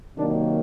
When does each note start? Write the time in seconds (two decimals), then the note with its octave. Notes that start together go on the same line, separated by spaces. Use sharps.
0.17 C3 D#3 F#3 A#3 D4